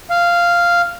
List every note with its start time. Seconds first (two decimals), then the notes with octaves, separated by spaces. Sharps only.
0.10 F5